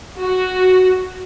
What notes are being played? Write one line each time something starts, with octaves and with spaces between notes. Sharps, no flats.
F#4